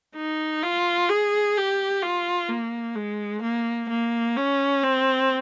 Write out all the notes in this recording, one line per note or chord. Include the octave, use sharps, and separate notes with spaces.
D#4
F4
G#4
G4
F4
A#3
G#3
A#3
A#3
C#4
C4